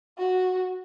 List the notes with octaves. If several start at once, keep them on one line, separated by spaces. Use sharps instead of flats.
F#4